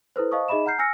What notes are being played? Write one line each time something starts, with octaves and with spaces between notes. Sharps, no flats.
E4 A4 B4 C5
C5 D#5 F5 A5 C#6 D#6
D#4 G#4 D#5 E5 B5 E7
F#5 A#5 F6 G6 C7
G#5 E6 F6 A#6 C#7